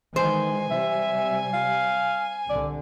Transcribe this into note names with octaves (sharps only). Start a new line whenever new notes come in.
D#3 E3 G#3 C5 G#5
C3 G3 E5
F5
C2 D3 D5